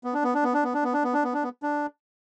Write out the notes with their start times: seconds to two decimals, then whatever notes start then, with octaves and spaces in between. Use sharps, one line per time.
0.04 B3
0.14 D4
0.24 B3
0.34 D4
0.44 B3
0.54 D4
0.64 B3
0.74 D4
0.84 B3
0.94 D4
1.04 B3
1.14 D4
1.24 B3
1.34 D4
1.43 B3
1.63 D4